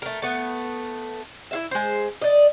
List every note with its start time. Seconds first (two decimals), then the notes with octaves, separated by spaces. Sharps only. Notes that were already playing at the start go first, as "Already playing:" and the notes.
0.02 A3 A#4
0.22 A3 B3
1.51 E4 F4 E5
1.71 G#3 C5
2.22 D5 D#5